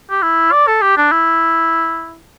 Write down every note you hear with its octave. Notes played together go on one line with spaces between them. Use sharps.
G4
E4
D5
A4
G4
D4
E4